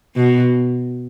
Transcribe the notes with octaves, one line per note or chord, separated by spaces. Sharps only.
B2